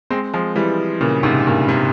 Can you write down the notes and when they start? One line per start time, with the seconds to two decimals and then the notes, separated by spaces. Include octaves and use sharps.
0.10 G#3 C4
0.33 F3 G#3
0.56 E3 G3
1.01 A#2 C#3
1.23 G#2 C3
1.47 G2 A#2
1.68 C3